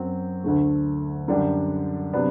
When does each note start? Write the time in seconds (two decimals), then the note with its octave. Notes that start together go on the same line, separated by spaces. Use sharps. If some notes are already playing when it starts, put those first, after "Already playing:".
Already playing: F#2 F#3 C4
0.44 D2 D3 A3
1.28 F#2 D3 G3 D4 G4
2.13 C3 F#3 B3 D4